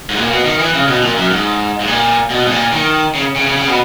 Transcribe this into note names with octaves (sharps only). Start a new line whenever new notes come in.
G#2
A#2
B2
D#3
E3
C#3
B2
A#2
F#2
G#2
G#2
A#2
B2
G#2
A#2
D#3
C#3
C#3
C#3
C#3
B2